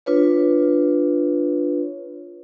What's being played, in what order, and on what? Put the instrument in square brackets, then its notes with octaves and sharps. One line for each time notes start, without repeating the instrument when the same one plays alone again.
[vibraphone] D4 F4 B4 C#5